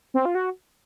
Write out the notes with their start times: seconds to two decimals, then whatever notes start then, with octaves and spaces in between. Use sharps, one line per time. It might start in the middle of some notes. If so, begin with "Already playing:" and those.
0.14 C4
0.25 F4
0.35 F#4